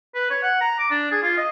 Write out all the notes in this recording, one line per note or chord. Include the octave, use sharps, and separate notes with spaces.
B4
C#5
F#5
A#5
D6
D4
G#4
F4
D#5